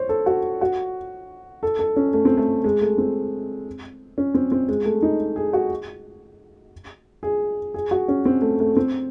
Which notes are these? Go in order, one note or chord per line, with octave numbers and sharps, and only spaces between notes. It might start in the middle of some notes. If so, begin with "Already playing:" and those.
Already playing: C5 C#5
A4
F#4
F#4
A4
A4
C#4
A3
C4
A3
G#3
A3
C4
C#4
C4
C4
G#3
A3
D#4
G#4
F#4
G#4
G#4
F#4
C#4
C4
A3
A3
C4